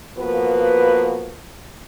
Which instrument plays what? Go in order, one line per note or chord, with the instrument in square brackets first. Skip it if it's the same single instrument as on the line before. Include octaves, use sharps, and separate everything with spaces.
[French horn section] F3 A#3 B3 F#4 B4